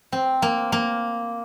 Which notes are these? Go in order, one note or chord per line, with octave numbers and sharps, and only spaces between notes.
C4
A#3
A#3